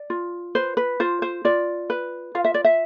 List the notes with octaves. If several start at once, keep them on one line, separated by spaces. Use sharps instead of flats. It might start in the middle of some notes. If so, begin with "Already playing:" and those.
Already playing: D5
F4
B4 C5
B4
F4 C5
C5
F4 D5
B4
F4 F5
E5
D5
E5